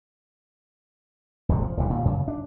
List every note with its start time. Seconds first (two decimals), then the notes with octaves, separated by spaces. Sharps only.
1.49 D#1 G#1 C3 F#3
1.62 F3
1.77 E1 D#2 E3 G3
1.90 G2 A#2
2.05 F#2 C#3
2.28 D4